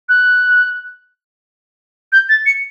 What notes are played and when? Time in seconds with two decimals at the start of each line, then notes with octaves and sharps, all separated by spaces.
0.09 F#6
2.12 G6
2.29 A6
2.46 C#7